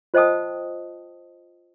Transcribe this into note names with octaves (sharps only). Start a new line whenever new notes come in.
F4 C5 D#5 G5 A5 D#6